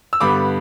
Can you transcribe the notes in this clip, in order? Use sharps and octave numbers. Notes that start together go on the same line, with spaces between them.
E6
G2 D3 G3 B3 B5 D6